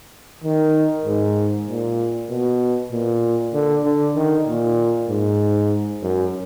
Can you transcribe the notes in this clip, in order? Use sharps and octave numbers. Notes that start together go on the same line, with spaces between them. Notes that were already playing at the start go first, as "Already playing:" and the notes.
D#3
G#2
A#2
B2
A#2
D3
D3
D#3
A#2
G#2
F#2